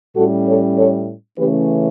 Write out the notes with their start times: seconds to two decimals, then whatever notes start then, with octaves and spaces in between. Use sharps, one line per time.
0.16 A2 G3 C#4 F#4 A4
0.47 A4 C#5
0.77 A4 C#5
1.38 C#3 E3 A3 C#4 G4 B4